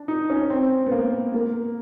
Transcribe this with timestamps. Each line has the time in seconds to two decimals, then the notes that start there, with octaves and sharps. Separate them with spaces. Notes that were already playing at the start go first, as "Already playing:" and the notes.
Already playing: D4
0.08 D#4
0.30 C#4
0.50 C4
0.86 B3
0.91 A#3
1.34 A#3